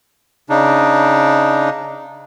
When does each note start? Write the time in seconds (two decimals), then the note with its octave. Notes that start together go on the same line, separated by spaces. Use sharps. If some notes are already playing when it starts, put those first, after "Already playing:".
0.50 C#3 D4 D#4